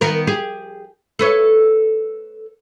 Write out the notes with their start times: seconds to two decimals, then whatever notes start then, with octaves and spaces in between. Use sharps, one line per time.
0.01 D#3 B3 A#4
0.27 G4 G#4
1.19 A4 B4 C#5